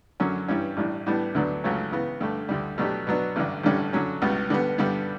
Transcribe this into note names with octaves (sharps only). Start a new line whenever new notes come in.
F#2 D3 F#3 C#4
G2 E3 G3 C#4
A1 A2 G3 D4
A2 E3 G3 B3 D4
D2 D3 F#3 B3 D4
C#2 C#3 F#3 A3 C#4
C#3 E3 B3
G2 D3 A3
D2 D3 G3
B2 F#3 A3 D4 G4
B2 F#3 B3 D4
A1 G2 D3
A1 G2 D3 G3 C#4
D3 F#3 C#4
C#2 B2 G3 B3
D3 G3 B3
G2 D3 G3 B3